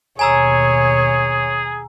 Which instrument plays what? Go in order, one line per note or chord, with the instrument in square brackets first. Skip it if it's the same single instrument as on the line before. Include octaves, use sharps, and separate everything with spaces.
[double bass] D#2 B2 [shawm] G#4 [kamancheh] C#5 [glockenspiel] G#5 A#5 E6